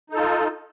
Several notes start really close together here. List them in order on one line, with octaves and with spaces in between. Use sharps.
D#4 A4 F4